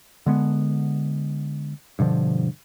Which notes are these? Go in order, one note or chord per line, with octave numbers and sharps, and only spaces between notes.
D3 G#3 B3
G2 B2 D3 F3